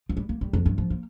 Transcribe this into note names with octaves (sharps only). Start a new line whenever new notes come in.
F3
G3
A#3
G3
F2
G2
F3
A#3